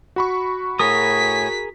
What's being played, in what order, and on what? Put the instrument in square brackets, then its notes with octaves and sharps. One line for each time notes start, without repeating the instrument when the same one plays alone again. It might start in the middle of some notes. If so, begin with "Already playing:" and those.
[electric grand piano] F#4 B5 C#6
[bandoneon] A2 G#5 [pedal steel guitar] G#4 A#4 D#6 [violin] B6